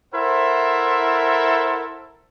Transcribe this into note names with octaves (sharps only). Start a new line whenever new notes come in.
E4 A4 A#4 C5 E5 F#5